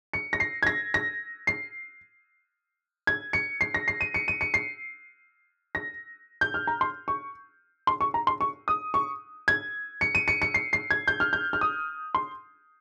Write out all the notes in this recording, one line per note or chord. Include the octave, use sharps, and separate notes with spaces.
C#7
A#6
C7
G#6
A#6
A#6
C7
G#6
C#7
C7
A#6
C7
D#7
C#7
D#7
C#7
C7
A#6
G6
F6
A#5
C6
C#6
C6
C#6
A#5
C6
C#6
D#6
C#6
G#6
C#7
D#7
C#7
C#7
C7
C7
G#6
G6
F6
G6
F6
D#6
C6